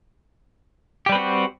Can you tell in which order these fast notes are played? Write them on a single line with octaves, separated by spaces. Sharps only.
G4 G3 B4 C4 F#4